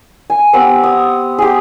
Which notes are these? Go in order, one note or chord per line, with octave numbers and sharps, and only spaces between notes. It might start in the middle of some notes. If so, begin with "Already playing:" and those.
G#5
B3 C4 G4 F#5
D#6
G4 G#4